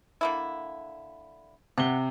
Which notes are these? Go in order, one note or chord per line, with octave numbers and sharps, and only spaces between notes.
D3 A#3 E4
C3 F#5 G7